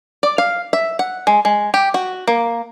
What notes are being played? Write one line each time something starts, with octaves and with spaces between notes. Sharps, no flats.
D5
F5
E5
F#5
G#3
G#3
G4
F#4
A#3